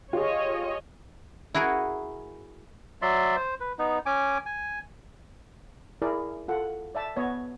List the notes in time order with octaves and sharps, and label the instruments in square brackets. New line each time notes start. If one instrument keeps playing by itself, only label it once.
[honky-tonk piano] F4 G4 G#4 [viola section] C#5 D#5
[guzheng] E4 F#4 G#4 A#4
[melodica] F#3 D5 E5 C6
C5
B4
B3 D#4
C#4 G#5 D6
G#5
[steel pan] E4 G#4 A#4 D5
F4 A4 F#5
D5 E5 A5
B3 C#5 D#5